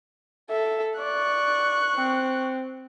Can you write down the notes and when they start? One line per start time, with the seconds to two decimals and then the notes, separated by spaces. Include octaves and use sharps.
0.51 A4 E5
0.99 D5 C#6 F#6
1.95 C4